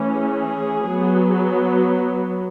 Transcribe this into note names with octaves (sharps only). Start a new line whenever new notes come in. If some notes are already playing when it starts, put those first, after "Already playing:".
Already playing: E3 A3 C#4
G#4
F#3 B3